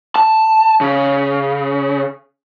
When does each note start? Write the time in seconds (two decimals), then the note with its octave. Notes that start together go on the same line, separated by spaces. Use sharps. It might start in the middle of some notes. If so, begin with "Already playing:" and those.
0.16 A5
0.81 C#3